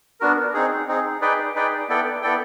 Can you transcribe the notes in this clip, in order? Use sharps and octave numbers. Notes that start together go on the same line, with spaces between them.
B3 D4 F#4 A#4
C4 D#4 G#4
C4 D#4 G#4
D#4 G#4 B4 D5 G5
D#4 G#4 B4 D5 G5
B3 E4 A4 D5 G5
B3 E4 A4 D5 G5